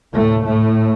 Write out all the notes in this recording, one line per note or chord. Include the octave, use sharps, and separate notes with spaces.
D2 A2 C3 A3
A2 A3